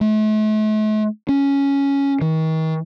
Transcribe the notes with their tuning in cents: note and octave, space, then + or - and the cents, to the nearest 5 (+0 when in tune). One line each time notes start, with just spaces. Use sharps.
A3 -40
C#4 +5
D#3 +40